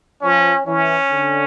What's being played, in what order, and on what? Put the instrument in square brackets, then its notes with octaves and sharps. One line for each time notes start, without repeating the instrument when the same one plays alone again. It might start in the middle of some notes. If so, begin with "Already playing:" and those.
[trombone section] F3 [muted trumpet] C#4
[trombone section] E3 [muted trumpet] C#4
[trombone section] D3